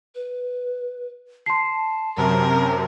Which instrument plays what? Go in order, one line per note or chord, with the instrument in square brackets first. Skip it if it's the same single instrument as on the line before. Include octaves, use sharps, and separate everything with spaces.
[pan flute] B4
[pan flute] A5 [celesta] C6 C7
[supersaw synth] F#2 C3 [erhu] A#4